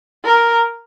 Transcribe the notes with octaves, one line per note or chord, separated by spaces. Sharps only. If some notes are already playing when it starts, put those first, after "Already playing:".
A#4